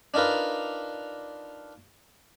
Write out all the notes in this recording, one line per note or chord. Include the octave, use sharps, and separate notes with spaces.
D4 D#4 F4 A#4 B4